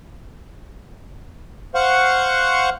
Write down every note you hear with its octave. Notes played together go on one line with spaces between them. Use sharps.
C5 F5 F#5 C#6